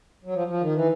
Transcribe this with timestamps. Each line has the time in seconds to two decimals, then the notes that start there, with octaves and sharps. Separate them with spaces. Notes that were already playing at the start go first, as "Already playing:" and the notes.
0.25 F#3
0.34 F3
0.47 F3
0.61 D#3
0.75 E3